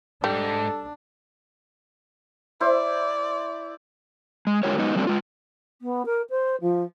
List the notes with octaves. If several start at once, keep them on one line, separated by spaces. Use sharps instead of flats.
G#2 G3 D4 A4
E4 C5 D5
G#3
D3 G#3 F4 G4 A#4 C#5
F#3 G#3 B3 D#4 D#5
F#3 G3 A3 C4 D4
G#3 F4
B3
A#4
C5
F3